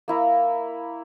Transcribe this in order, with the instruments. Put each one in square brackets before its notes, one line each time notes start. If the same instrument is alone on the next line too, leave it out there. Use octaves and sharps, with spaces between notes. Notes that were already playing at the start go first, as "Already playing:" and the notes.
[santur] A#3 E4 A#5